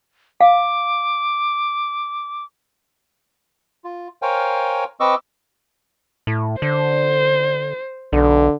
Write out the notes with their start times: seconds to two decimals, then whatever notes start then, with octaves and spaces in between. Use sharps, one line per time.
0.41 F5 D6
3.84 F4
4.22 A#4 C5 C#5 F5 G5 G#5
5.00 C4 B4 D#5 C#6 D6 E6
6.27 A2
6.62 D3 C5
8.13 B1 D3